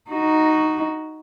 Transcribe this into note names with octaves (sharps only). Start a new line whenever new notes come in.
D#4 F#4